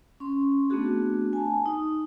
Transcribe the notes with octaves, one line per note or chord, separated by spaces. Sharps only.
C#4 C6
A3 B3 C4 D4 F#4 G#4
G#5 A5
D#4 D#6